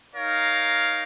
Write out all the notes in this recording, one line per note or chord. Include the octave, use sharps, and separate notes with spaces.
D#4 A#4 C#5 F5